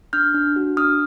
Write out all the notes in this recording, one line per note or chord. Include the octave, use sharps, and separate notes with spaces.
D4 F6 G6
D4
F#4
D4 D#6 F6